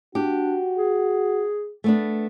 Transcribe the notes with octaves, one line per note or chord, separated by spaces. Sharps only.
D4 F#4 G4
G#4
A3 B3 D4